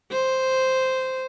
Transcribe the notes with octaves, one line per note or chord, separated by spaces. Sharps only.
C5